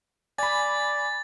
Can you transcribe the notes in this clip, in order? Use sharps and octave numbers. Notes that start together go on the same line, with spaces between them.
D5 G#5 B5 A6